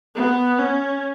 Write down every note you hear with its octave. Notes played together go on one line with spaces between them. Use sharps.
B3
C#4